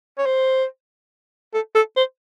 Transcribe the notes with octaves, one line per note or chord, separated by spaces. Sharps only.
C#5
C5
A4
A4
C5